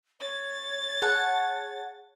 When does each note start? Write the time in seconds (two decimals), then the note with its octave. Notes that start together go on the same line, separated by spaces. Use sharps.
0.20 C#5 A6
1.02 G#4 F#5 A5